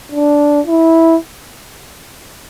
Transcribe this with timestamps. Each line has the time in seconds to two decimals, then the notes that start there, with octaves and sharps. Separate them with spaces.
0.12 D4
0.67 E4